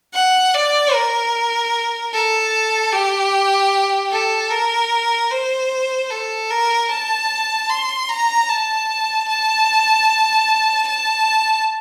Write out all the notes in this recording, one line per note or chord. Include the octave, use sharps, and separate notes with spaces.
F#5
D5
A#4
A4
G4
A4
A#4
C5
A4
A#4
A5
C6
A#5
A5
A5
A5